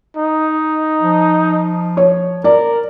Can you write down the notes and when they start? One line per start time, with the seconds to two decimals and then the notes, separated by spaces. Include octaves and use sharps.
0.17 D#4
1.01 F3
1.97 C#5
2.44 A#4 D5